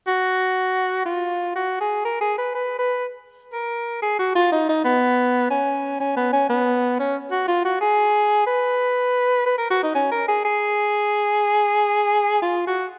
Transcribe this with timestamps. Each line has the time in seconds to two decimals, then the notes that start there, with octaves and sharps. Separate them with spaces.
0.07 F#4
1.05 F4
1.55 F#4
1.80 G#4
2.05 A#4
2.21 G#4
2.38 B4
2.55 B4
2.79 B4
3.53 A#4
4.02 G#4
4.19 F#4
4.35 F4
4.52 D#4
4.69 D#4
4.84 B3
5.50 C#4
6.00 C#4
6.17 B3
6.33 C#4
6.50 B3
6.99 C#4
7.31 F#4
7.48 F4
7.65 F#4
7.81 G#4
8.47 B4
9.46 B4
9.58 A#4
9.70 F#4
9.83 D#4
9.95 C#4
10.12 A#4
10.28 G#4
10.45 G#4
12.42 F4
12.67 F#4